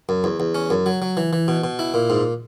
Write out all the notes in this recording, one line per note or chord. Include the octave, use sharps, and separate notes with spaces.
F#2
E2
E2
C#4
F#2
F#3
F#3
E3
E3
B2
B2
E4
A#2
G#2